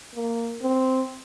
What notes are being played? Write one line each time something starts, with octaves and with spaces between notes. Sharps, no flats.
A#3
C4